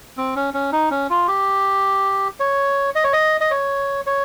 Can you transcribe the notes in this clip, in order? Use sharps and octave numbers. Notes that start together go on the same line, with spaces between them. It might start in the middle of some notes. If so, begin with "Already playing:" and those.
C4
C#4
C#4
D#4
C#4
F4
G4
C#5
D#5
C#5
D#5
D#5
C#5
C#5